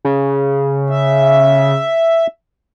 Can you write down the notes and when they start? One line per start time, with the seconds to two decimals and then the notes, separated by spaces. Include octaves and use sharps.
0.05 C#3
0.90 E5